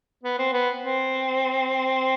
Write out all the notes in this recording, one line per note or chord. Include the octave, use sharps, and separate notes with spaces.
B3
C4
B3
C4